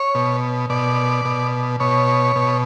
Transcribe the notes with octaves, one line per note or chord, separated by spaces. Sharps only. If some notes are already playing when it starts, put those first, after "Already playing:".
Already playing: C#5
B2
B2 D5
B2
B2 C#5
B2